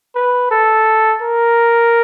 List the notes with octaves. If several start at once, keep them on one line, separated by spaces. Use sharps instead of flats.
B4
A4
A#4